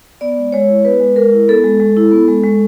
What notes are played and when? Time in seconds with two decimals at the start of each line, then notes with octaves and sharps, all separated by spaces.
0.21 B3 D5
0.37 G#3
0.52 G#3 C#5
0.69 E4
0.84 B3 B4
1.00 G#3
1.16 G#3 A#4
1.33 E4
1.48 B3 A4
1.64 G#3
1.80 G#3
1.97 E4
2.11 B3
2.28 G#3
2.44 G#3